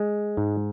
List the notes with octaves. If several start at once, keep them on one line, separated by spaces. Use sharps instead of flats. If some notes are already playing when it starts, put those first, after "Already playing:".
Already playing: G#3
G#2